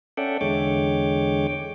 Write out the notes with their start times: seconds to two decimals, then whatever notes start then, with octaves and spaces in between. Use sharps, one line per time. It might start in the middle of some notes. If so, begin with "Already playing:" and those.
0.17 C#4 A4 D5 E5 F#5 G5
0.41 E2 D3 G#3 C#5 G5 D6